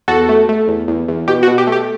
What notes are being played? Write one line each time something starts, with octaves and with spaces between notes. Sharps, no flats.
E2 F#4 A4
A3
A3
E2
E2
E2
B2 G4
F#4
B2
G4
A3
G4